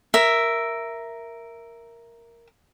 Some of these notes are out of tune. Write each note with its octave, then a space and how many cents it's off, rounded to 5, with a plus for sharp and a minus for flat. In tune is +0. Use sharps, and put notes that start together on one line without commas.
A#4 +0 E5 +5